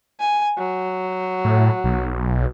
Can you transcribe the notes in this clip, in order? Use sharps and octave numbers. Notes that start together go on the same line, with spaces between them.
G#5
F#3
A2
B1